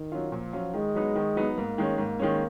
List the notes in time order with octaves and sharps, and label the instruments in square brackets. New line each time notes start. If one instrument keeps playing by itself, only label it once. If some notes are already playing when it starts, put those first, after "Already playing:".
Already playing: [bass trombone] D#3
[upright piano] F#3 C#4 F4
[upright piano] A#2 [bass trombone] F3
[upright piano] F#3 C#4 F4
[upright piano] D#3 [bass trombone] G#3
[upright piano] F#3 B3 D#4
D#3
F#3 B3 D#4
[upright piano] G#2 [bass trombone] A#3
[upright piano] D#3 G#3 C#4
[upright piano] G#2 [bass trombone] A#3
[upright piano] D#3 G#3 C#4